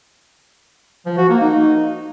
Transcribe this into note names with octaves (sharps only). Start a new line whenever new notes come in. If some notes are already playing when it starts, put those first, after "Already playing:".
F3
F#4
A#3
D#4